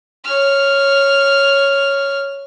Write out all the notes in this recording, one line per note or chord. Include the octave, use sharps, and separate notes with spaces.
C#5 F6